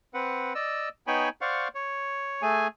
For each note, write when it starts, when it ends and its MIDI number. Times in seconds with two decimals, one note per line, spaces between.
0.14 0.53 60
0.14 0.53 71
0.14 0.53 78
0.55 0.89 74
0.55 0.89 75
0.55 0.89 88
1.07 1.29 59
1.07 1.29 63
1.07 1.29 73
1.07 1.29 79
1.07 1.29 80
1.07 1.29 83
1.41 1.68 72
1.41 1.68 74
1.41 1.68 77
1.41 1.68 78
1.41 1.68 85
1.75 2.42 73
2.42 2.67 57
2.42 2.67 68
2.42 2.67 80